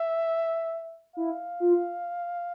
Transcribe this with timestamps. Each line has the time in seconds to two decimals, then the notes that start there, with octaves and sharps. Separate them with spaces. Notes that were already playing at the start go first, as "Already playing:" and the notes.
Already playing: E5
1.16 E4 F5
1.60 F4